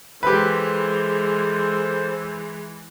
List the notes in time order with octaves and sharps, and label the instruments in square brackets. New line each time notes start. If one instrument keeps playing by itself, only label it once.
[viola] E3 G#3 [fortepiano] G4 B4 [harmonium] A4 C5